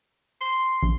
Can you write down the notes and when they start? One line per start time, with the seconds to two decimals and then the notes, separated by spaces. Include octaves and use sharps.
0.41 C6
0.83 A#1